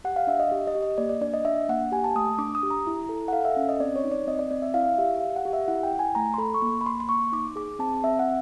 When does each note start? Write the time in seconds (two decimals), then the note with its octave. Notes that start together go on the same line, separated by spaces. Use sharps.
0.04 G4 F#5
0.16 F5
0.27 D4 E5
0.40 D#5
0.52 G4
0.67 D#5
0.75 G4
0.83 D#5
0.98 A#3 D5
1.09 D5
1.21 D4 D5
1.34 D#5
1.45 D4 E5
1.69 A#3 F#5
1.92 G4 G#5
2.04 A5
2.15 A3 D#6
2.39 D4 D6
2.55 D#6
2.63 G4
2.71 A#5
2.87 E4
3.09 A4
3.28 F#5
3.33 A4 F5
3.45 E5
3.57 C#4
3.69 D#5
3.80 C4 D5
3.96 C#5
4.04 D#4
4.12 D5
4.27 C4 D#5
4.39 D5
4.51 C4 D5
4.62 E5
4.74 E4 F5
4.98 G4 E5
5.21 G4 F5
5.36 F#5
5.45 G4
5.53 E5
5.68 E4 F#5
5.83 G5
5.91 E4
5.99 G#5
6.15 A3 A#5
6.34 C6
6.38 A4 B5
6.54 C#6
6.62 A#3 C6
6.81 B5
6.86 A#3 C6
7.00 C6
7.09 A#3 C#6
7.32 D#4 D6
7.56 G#4 D6
7.79 C4 A5
8.03 C4 E5
8.19 F#5